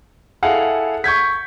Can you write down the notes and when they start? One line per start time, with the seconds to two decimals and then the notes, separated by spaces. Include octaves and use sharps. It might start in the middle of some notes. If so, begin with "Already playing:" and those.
0.43 E4 G#4 A4 F5 F#5
1.04 C#6 G6 G#6 B6